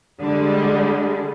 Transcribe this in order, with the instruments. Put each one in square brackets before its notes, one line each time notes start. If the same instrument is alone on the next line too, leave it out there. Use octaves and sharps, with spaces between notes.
[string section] D3 [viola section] G3 G#3